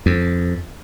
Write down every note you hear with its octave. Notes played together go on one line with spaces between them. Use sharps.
F2